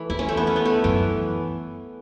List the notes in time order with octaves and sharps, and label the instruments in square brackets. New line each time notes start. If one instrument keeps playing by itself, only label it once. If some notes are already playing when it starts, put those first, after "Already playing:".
Already playing: [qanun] E3 A3
[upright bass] E2 [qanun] E4
[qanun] C#4
A3
B3
C#4
B3
A3
[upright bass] F#2 [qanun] E3